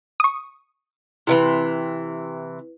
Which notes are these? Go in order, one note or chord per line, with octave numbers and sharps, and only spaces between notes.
C#6 D#6
C3 D#3 E3 E4 B4